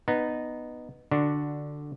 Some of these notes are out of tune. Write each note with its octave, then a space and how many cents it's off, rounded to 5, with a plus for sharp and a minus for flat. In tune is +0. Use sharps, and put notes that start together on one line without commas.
B3 +0 D#4 -15
D3 +5 D4 +0 F#4 +0